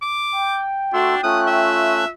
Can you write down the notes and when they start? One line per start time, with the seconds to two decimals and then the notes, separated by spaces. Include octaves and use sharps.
0.02 D6
0.32 G5
0.93 A3 D4 F#4 C6 E6
1.23 A3 C#4 F4 D#6 F#6
1.47 E5